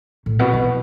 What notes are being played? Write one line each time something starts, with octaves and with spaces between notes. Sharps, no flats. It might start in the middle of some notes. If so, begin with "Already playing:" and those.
A2
B2
E3